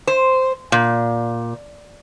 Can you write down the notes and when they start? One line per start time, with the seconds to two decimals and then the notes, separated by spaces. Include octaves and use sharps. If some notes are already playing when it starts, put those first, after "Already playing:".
0.07 C5
0.72 A#2